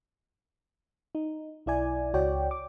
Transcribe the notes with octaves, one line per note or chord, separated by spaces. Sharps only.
D#4
B1 E4 D5 G#5
C#2 F#4 C#5 D5 G5
D6